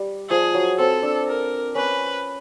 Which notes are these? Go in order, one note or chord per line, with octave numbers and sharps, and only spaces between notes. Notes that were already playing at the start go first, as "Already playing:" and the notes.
Already playing: G3
F3 G#4
F#3
C4 A4
D4
A#4
C#4 B4